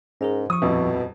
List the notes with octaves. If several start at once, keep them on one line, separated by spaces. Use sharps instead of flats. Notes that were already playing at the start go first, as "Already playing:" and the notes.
G#2 C#4 G#4 A#4
F3 C#6 D#6
D#1 F2 B2 E4